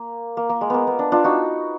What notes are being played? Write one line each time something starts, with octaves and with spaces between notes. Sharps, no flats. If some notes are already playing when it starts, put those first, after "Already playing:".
Already playing: A#3
A#3
A#3
G#3
A#3 B3
B3
D4
D4 F4
D#4 F#4